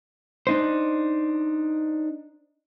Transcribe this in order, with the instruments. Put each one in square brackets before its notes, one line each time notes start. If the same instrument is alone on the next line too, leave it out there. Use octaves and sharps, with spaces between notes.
[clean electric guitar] D4 D#4 C5